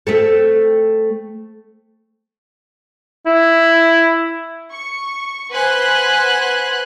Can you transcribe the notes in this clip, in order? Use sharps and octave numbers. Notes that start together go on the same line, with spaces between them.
A3 C4 A4
E4
C#6
B4 C5 F#5 G#5 C6 F#6